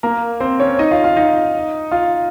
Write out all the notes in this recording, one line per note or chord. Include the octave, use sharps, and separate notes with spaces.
A#3 A#4
C4 C5
C#4 C#5
D#4 D#5
F4 F5
F4 F5
D#4 D#5
F4 F5